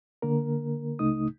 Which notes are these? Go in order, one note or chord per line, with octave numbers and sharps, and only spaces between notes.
D3 A#3 A#4
C#2 C#3 A3 D#4 D#6